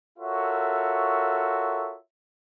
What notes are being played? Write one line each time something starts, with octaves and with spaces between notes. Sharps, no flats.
F4 F#4 A4 A#4 C#5 E5